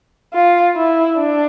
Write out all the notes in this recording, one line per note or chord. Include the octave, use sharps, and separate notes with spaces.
F4
E4
D4